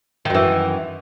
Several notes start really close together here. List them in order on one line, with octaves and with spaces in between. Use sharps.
D#3 F#2 E3